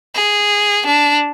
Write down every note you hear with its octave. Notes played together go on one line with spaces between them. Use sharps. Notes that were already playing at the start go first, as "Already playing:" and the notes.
G#4
D4